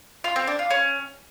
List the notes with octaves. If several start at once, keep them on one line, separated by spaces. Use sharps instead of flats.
F4
C4
D4
F4
C#4